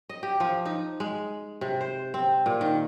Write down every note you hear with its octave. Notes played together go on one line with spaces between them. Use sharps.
D#5
G4
F3
D#4
G#3
C3
C5
C4
A#2
D#3